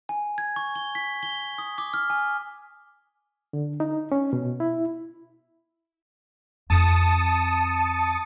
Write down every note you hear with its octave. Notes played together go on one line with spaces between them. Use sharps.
G#5
G#6
C#6
G7
B6
G7
D#6
D6
F6
G#5
D3
D#4
C#4
B2
E4
F2 C4 A5 D#6 C#7